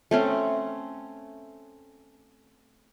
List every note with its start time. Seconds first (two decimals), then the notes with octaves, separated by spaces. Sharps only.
0.11 A3 C4 C#4